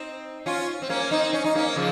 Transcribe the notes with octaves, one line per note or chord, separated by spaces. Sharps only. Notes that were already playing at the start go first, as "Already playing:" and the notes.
Already playing: C4 D#4
C#4 F4
C4
A#3 C#4
C4 D#4
C#4
D#4
A#3 C#4
C#3 F3